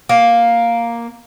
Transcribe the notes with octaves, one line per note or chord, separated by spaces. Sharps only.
A#3